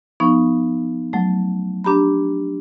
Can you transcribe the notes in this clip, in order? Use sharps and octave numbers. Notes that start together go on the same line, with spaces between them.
F3 B3 D#4 C#6
F#3 A3
D4 G4 A#5 B5